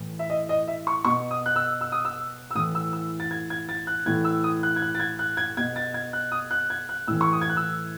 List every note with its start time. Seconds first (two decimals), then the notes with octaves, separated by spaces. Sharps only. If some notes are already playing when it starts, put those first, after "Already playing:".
Already playing: A2 E3
0.19 E5
0.30 D#5
0.49 D#5
0.68 E5
0.87 C#6
1.05 B2 C#6
1.31 D#6
1.46 F#6
1.56 E6
1.81 E6
1.92 D#6
2.05 E6
2.51 E6
2.55 A2 E3 D#6
2.75 E6
2.93 E6
3.20 A6
3.31 G#6
3.50 G#6
3.69 A6
3.87 F#6
4.06 A2 E3 G#6
4.24 E6
4.44 D#6
4.63 F#6
4.76 G#6
4.82 F#6
4.95 A6
5.00 G#6
5.19 F#6
5.37 G#6
5.57 B2 G#6
5.76 A6
5.94 G#6
6.13 F#6
6.32 D#6
6.51 F#6
6.70 G#6
6.89 F#6
7.07 A2 E3 E6
7.21 C#6
7.33 D#6
7.42 G#6
7.49 F#6
7.57 E6